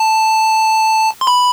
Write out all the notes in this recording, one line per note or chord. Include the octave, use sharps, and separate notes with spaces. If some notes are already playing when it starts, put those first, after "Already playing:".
Already playing: A5
C6
B5